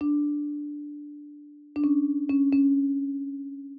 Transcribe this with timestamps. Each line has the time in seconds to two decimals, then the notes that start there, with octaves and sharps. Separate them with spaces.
0.01 D4
1.76 D4
1.84 C#4
2.29 C#4
2.53 C#4